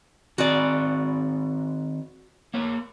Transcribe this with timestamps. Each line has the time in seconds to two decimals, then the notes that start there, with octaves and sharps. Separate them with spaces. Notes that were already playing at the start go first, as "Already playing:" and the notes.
0.38 D#3 C4 F#4 D5 G#5
2.54 A#3 C#5